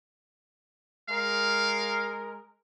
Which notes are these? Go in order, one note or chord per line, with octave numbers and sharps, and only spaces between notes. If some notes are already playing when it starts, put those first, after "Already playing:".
G#3 A#4 F5